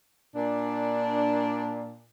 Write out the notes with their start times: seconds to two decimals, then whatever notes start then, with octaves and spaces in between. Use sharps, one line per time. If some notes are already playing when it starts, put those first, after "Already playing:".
0.36 A#2 D4